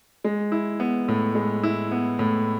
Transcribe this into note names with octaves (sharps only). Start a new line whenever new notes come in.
G#3
E4
B3
A2
G#3
E4
B3
A2